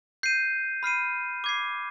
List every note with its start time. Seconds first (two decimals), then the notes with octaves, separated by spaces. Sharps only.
0.23 G6 C7 D#7
0.83 B5 F6 C7 D#7
1.44 D6 G#6 C7